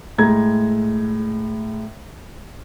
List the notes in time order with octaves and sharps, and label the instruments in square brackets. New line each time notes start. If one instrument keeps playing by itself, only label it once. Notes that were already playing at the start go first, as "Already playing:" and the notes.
[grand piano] A2 G#3 A#5 G#6